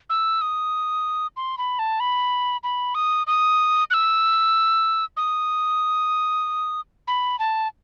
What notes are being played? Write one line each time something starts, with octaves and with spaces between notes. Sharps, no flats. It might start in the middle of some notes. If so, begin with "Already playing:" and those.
E6
D#6
C6
B5
A5
B5
B5
D#6
D#6
F#6
E6
D#6
B5
A5